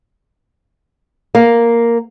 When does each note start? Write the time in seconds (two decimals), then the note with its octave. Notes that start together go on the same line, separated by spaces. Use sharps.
1.35 A#3